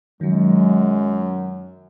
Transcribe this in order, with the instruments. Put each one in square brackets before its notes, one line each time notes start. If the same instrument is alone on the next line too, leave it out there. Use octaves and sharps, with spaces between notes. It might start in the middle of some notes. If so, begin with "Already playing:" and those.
[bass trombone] F#2 [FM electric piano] D#3 F#3 [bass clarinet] G#3